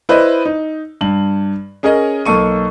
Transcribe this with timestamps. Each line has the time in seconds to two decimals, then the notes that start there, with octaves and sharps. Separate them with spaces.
0.09 E4 B4 C5 D5 D#5
0.45 D#4
1.01 G2 F#7
1.83 C#4 G#4 A#4 C#5 D#5
2.25 B1 A#3 A4 C#6 D#7